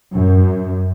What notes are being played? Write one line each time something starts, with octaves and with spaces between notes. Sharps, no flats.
F#2